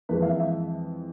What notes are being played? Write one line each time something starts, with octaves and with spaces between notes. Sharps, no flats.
F2 E3 G#3 B4
F5
E5
E5